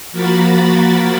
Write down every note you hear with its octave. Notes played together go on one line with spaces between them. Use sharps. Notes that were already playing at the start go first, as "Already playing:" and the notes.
F3 A#3 F#4 A#4 B5 A6